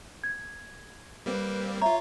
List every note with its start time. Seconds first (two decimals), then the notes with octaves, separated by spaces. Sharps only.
0.24 G#6
1.26 G3 A#3 C4 B4
1.82 F4 C#5 E5 A#5